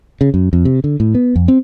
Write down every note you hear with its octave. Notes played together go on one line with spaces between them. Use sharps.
C#3
F#2
F2
C3
D3
A2
B3
F2
C4